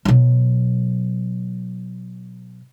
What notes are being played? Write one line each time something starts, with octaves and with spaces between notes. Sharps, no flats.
B2 F#3